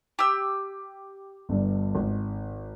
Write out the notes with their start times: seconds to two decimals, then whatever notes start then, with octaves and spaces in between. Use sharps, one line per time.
0.19 G4 E6
1.49 G1 G2
1.95 G#1